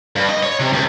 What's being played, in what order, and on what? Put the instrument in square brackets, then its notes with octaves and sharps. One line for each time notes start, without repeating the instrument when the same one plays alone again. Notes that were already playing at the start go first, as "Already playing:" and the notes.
[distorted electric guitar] G2
D#5
C#5
C3
C#2